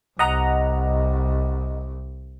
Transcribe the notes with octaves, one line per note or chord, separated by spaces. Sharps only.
C2 D#5 F#5 A#5